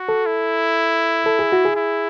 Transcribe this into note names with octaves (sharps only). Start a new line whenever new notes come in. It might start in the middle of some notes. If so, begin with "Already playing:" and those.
Already playing: F#4
A4
E4
A4
G#4
F#4
G#4
E4